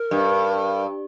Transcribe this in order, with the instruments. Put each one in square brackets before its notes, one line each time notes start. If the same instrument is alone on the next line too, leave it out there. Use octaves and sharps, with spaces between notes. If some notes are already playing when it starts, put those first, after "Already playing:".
Already playing: [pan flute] A#4
[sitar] G2